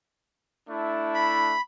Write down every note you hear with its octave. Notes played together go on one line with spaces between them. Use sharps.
A3 D4 E4
B5